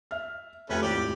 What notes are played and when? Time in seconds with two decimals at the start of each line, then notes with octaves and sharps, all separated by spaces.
0.11 E5 F6
0.70 F1 A3 C#4 F4 G4 B4
0.82 G#1 D#2 E4 G4 D5